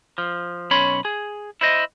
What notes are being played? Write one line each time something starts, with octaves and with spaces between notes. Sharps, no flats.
F3
B1 C#4 C#5 B5 C6
G#4
E4 C5 D#5